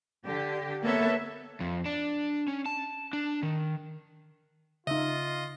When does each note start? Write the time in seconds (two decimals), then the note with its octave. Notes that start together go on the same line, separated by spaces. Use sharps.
0.23 D3 G4
0.82 A#3 B3 A4 B4 C#5 E5
1.60 F2
1.86 D4
2.48 C#4
2.66 A5
3.13 D4
3.43 D#3
4.87 C#3 D#4 F4 D#5 E5